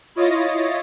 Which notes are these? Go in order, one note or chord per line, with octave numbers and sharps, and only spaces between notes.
E4 F4 C#5 D#5 A6 A#6